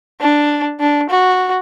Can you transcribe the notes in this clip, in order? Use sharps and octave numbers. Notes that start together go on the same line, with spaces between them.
D4
D4
F#4